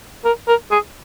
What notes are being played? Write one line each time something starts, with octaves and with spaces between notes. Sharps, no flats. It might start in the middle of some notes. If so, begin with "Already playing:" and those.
A#4
A#4
G#4